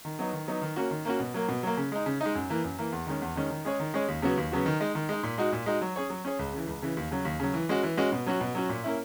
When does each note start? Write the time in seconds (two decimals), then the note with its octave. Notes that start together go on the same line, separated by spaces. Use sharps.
0.05 D#3
0.19 F#3 B3 D#4
0.33 D#3
0.48 F#3 B3 D#4
0.62 D#3
0.76 A#3 C#4 F#4
0.91 D#3
1.05 A#3 C#4 F#4
1.20 B2
1.34 F#3 A#3
1.49 B2
1.63 F#3 A#3
1.77 C#3
1.92 G#3 D#4
2.06 C#3
2.21 G#3 D#4
2.35 F#2
2.50 E3 A#3
2.64 F#2
2.79 E3 A#3
2.92 E2
3.07 D#3 G#3 C#4
3.22 E2
3.36 D#3 G#3 C#4
3.50 D#3
3.65 G#3 C#4 G#4 C#5
3.80 D#3
3.94 G#3 C#4 G#4 C#5
4.08 D#2
4.22 C#3 F#3 B3 F#4
4.37 D#2
4.52 C#3 F#3 B3 F#4
4.66 D#3
4.80 G#3 D#4
4.95 D#3
5.09 G#3 D#4
5.23 A#2
5.38 G#3 D#4 F#4
5.52 A#2
5.66 G#3 D#4 F#4
5.81 F#3
5.96 C#4 G#4 C#5
6.10 F#3
6.25 C#4 G#4 C#5
6.39 C#2
6.53 C#3 E3
6.67 C#2
6.82 C#3 E3
6.97 D#2
7.11 C#3 F#3
7.25 D#2
7.40 C#3 F#3
7.54 E3
7.69 G#3 C#4 F#4
7.83 E3
7.97 G#3 C#4 F#4
8.12 B2
8.26 F#3 C#4 F#4
8.41 B2
8.55 F#3 C#4 F#4
8.69 A#2
8.84 A#3 C#4 E4